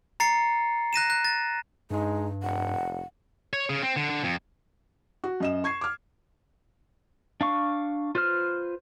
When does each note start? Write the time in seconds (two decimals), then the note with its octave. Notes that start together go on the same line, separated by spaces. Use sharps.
0.20 A#5 A6 C7 C#7
0.93 F#6 A#6 D#7 E7
1.10 F#6
1.25 A6
1.91 G2 G#3 D#4
2.43 F1 F#5
3.53 C#5
3.70 C#3
3.82 C4
3.96 D3
4.10 D3
4.24 F2
5.24 F#4
5.40 F#2 D#5 E7
5.64 C#6 G#6 C7
5.81 D6 F6
7.41 D4 F5 C#6
8.15 F4 B4 C5 F6